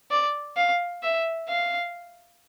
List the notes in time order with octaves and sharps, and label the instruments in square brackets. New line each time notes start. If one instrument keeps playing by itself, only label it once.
[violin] D5
F5
E5
F5